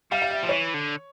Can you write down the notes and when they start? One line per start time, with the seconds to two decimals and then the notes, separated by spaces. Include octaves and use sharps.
0.11 G3 F5
0.22 F5
0.31 E5
0.43 F3
0.49 E3 C#5
0.74 D3